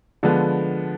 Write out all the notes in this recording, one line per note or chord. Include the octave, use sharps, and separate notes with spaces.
D3 F3 G#3 B3